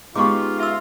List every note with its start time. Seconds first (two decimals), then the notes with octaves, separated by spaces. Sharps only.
0.15 G#3 B3 C#4 D#4 F4 G4 C#6 D6
0.59 F4 E5 E6